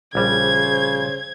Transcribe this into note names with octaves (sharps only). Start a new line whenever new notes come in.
A#1 C#3 G3 C5 G#6